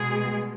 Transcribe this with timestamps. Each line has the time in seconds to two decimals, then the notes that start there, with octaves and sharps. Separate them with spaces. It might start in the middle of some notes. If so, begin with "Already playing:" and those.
Already playing: B2 G#3 G#4